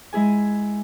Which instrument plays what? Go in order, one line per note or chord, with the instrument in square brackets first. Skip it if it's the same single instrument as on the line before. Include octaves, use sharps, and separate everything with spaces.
[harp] G#3 E4 G#4 G#5